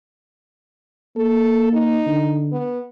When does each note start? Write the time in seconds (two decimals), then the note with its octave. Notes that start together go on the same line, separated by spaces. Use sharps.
1.17 A#3 A4
1.73 D#4
2.07 D3
2.52 B3